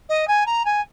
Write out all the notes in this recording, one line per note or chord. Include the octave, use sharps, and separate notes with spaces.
D#5
G#5
A#5
G#5